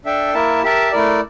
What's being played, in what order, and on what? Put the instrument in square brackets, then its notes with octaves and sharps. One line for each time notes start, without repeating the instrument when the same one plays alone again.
[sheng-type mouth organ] D4 A4 E5 G5
A#3 E4 A#4 E5 A5
G4 A#4 E5 A5
A3 E4 A#4 D5